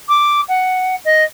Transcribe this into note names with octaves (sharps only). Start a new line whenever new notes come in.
D6
F#5
D#5